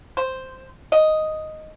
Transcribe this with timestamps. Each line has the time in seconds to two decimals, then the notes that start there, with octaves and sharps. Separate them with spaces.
0.17 C5
0.92 D#5